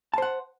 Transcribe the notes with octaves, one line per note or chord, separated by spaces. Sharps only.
C5 F#5 A5